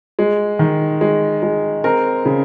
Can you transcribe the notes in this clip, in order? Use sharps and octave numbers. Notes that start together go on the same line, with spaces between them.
G#3
D#3
G#3
G#3
C4 A#4
C#3